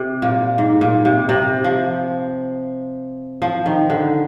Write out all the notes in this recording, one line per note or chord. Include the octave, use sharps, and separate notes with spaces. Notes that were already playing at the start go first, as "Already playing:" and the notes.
Already playing: C3
A#2
G#2
A#2
C3
C3
F3
F3
D#3
D3